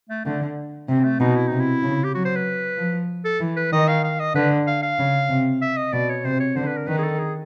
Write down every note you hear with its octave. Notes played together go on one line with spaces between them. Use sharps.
A3
D3 A3
C3 C4
A3
B2 D#4
E4
C3 D#4
E4
C#3
G4
F#3 F#4
C5
B4
F3
A4
E3
B4
D#3 D#5
F5
F5
D#5
D3 B4
F5
F5
C#3
C3
E5
D#5
B2 D5
C#5
C3 C5
C#5
D3 C5
B4
A#4
D#3 B4
G#4
A4
G#4